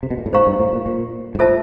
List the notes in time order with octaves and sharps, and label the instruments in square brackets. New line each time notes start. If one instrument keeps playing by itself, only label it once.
[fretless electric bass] C3
B2
A#2
A2
[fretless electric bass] G#2 [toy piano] C5 F5 A#5 C#6
[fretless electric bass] G2
A2
A#2
A#2
G#2
[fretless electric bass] A2 [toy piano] F4 A4 C5 E5 A5